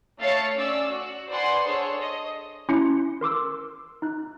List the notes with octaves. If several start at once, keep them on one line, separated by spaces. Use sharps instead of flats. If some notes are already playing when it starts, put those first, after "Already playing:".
A3 C#5 F5 A6 C7 C#7
C#4 D5 E6
F#4
B4 C5 D5 F#5 G#5 C6
D4 G#4 A4 C5 C#5
D#5
C#4 E4 C6 C#7
A#4 C6 D6 E6
D#4 F#6